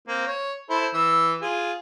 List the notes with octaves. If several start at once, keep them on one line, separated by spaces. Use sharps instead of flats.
A#3 C4
C#5
E4 A4 C5
E3 E6
F4 G#4